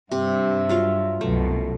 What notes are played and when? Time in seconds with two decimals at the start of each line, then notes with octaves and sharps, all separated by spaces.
0.11 G2 C3 E5
0.69 F#3 F4 F5
1.21 C2 F#2 B2 A3